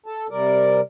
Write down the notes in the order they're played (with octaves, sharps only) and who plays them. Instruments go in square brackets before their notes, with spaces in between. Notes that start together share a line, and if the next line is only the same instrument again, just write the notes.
[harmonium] A4 A5
C3 G3 A#4 D5